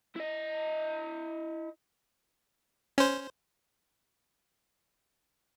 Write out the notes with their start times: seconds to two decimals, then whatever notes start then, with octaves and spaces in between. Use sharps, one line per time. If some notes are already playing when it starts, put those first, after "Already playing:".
0.16 E4 D#5
2.98 C#4 C5